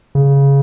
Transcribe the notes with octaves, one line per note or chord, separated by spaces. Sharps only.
C#3